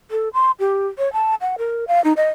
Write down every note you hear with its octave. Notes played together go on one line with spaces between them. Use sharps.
A4
C6
G4
C#5
A5
F#5
A#4
F5
D#4
D#5